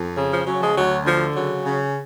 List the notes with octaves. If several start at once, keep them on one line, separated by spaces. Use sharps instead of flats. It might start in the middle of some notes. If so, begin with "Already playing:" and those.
Already playing: F2
C#3
F3
C#3 F#3
F3 G#3
D2 F#3
D3 F3
C#3 F#3
C#3